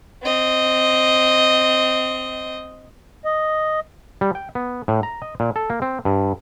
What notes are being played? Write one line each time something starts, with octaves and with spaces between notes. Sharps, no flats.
C4 D#5
D#5
G3
G5
B3
A2
A#5
D#5
A#2
A4
A#3
C4
G2